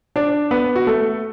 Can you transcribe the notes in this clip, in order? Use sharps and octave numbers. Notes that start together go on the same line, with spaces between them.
D4 D5
B3 B4
F#4
A3 A4